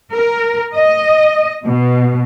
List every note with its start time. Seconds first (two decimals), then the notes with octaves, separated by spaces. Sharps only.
0.14 A#4
0.75 D#5
1.65 B2